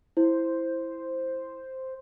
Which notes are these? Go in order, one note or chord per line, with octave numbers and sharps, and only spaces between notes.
E4 C5